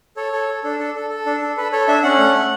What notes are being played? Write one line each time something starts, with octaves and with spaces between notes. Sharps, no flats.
A4 C#5
A4
A4
D4 A4
A4
A4
A4
D4
A4
A4 B4
A4 C#5
D4 E5
C#4 F#5
A3
A3